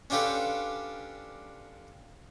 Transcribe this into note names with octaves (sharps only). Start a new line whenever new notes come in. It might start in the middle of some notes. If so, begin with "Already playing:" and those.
C#4 D4 F4 G4 A4 B4